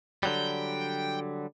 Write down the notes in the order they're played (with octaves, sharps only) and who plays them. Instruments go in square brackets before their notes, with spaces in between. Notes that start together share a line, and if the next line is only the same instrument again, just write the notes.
[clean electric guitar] D3 F#3 G3 [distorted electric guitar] G5